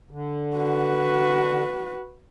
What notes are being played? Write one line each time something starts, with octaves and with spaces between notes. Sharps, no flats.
D3
F#4 B4